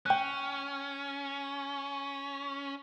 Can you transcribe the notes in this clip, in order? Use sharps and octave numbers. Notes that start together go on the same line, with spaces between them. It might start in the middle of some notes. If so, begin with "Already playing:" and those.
C#4 G5 F#6